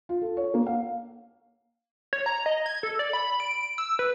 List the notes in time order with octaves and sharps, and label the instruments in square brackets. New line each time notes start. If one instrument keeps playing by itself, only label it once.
[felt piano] F4
A4
C#5
A#3
F5
[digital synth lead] C#5
A#5
D#5
G#6
A4
D5
B5
D7
E6
B4